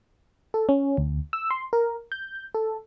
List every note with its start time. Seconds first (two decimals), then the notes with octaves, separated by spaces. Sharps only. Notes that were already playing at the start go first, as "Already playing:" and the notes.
0.54 A4
0.69 C#4
0.97 D2
1.33 E6
1.51 C6
1.73 A#4
2.12 G6
2.55 A4